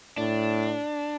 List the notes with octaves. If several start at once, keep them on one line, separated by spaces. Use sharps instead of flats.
A2 D4